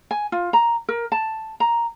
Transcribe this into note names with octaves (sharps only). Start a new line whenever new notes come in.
G#5
F4
A#5
A#4
A5
A#5